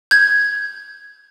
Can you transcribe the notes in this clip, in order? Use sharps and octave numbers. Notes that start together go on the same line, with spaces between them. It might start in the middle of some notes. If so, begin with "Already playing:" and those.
G6 G#6